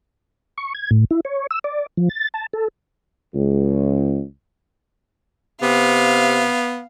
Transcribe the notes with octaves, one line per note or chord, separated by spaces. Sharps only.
C#6
G#6
A2
E4
C#5
E6
D5
F3
A6
A5
A4
C#2
C3 B3 F5